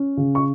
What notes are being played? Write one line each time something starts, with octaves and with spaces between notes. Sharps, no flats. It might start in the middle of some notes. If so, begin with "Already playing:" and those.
Already playing: C#4
C#3
C#6